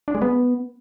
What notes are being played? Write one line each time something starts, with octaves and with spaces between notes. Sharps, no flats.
D4
G#3
B3